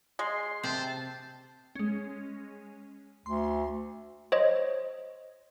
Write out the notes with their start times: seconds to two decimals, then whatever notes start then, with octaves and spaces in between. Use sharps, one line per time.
0.19 G#3 C6
0.63 C3 C4 C5 A5
1.75 G#3 C#4
3.26 D2 C6
4.32 C5 C#5 D#5